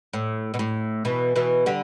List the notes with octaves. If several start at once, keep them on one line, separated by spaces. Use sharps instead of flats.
A2
B2
A2
B2 E3
B2 E3
D3 G3